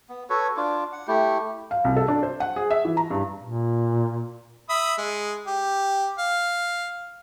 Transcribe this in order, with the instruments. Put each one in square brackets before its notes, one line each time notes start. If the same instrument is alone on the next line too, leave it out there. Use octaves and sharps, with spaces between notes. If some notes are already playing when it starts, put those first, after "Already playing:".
[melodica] B3
F#4 A4 B4 C#5
D4 F4 D6
F#5
A3 E4 G4
[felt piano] F5
C2
A4
D4
C5
F#5
G#4
E5
E3
A#5
G2
[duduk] A#2
[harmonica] E5 B5 D#6
G#3
G4
F5